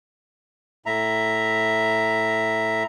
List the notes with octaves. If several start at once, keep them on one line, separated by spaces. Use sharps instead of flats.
A2 E5 A#5